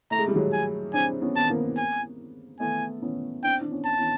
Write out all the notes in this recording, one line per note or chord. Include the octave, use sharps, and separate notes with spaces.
A3 A#5
G#3
G3
F#3 G#3
G#5
C4 D4 G#5
B3 C#4
B3 A5
A#3 C4
G#5
A3 B3 G#5
B3 C#4
C4 D4 G5
D4
B3 C#4
A5
B3 C#4